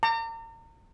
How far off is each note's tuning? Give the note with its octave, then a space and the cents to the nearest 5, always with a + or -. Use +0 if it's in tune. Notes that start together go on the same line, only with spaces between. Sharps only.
A#5 -40 D6 +0